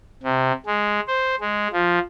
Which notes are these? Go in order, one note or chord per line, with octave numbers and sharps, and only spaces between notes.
C3
G#3
C5
G#3
F3